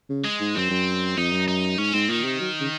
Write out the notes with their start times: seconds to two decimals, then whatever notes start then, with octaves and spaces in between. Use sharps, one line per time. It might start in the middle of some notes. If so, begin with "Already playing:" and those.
0.10 C#3
0.25 G#3
0.40 G#2
0.55 F#2 C4
0.70 F#2
1.17 F2 D#4
1.32 F#2
1.48 D#4
1.78 G#2 C#4
1.93 G#2 C4
2.09 A#2 D#3
2.24 C3
2.40 F#3
2.60 C#3